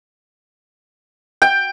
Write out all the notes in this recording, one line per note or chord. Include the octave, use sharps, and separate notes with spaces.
G5